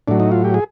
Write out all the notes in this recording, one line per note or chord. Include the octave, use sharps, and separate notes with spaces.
A2 F#3 D4
D#4
F4
G4
G#4